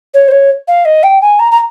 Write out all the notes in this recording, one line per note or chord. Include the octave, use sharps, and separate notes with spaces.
C#5
C5
C#5
F5
D#5
G5
G#5
A#5
A#5